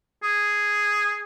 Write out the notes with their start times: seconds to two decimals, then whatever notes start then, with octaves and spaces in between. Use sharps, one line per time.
0.23 G#4